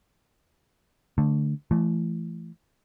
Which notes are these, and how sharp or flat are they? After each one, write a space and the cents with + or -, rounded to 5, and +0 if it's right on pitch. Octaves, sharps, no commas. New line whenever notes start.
D3 +0 A3 +0
E3 +30 A3 +0